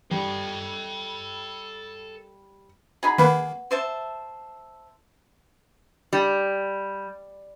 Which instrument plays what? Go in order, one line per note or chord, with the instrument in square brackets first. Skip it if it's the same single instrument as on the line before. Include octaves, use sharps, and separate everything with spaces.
[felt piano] G3 [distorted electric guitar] A4 G5
[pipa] F#3 D#4 B5 [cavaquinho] G#4
[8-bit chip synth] D#3 A#3 [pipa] B4 F#5
[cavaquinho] C5 E5 A5
[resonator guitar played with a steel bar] G3